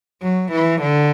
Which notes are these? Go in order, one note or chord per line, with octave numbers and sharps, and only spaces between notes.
F#3
E3
D3